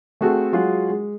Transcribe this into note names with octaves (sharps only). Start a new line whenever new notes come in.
A3 C4 F#4 G#4 A4
F#3 G#3 F4 F#4 G#4 F#5
G#3